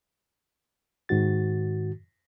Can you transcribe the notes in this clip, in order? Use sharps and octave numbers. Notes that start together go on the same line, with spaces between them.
G#2 D#3 F#4 A6